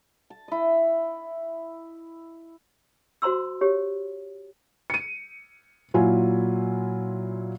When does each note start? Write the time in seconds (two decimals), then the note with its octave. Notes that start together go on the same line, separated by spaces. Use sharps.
0.30 A5
0.48 E4 D#5
3.22 F#4 C5 A#5 C6 E6
3.61 G4 C#5
4.90 C#7 D#7
5.94 A#2 F#3 E4 F4 G#5